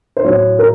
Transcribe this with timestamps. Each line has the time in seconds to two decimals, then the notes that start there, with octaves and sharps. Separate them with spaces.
0.17 C5
0.24 A2 F#3 C#5
0.59 A#4